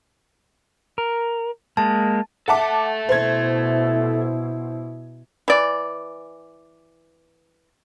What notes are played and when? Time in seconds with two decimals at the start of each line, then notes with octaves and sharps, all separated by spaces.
0.98 A#4
1.77 G#3 A#3 A5
2.48 A4 E5 F#5 A5 D6
3.09 B2 E4 C5 G#6
5.48 E3 D5